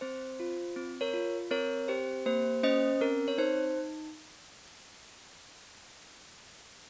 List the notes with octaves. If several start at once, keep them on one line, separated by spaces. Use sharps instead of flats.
C4 C5
F4
C4
A#4 C#5
F4
C4 A#4 C#5
G4 C5
A#3 C5
C#4 C5 D#5
C4 A#4
C#5
D#4 C5